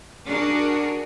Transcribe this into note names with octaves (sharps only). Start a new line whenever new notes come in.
D4 F#4 G#4 A#4